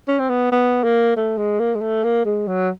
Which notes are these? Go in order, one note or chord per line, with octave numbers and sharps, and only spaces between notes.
C#4
C4
B3
B3
A#3
A3
G#3
A#3
G#3
A3
A#3
G#3
F#3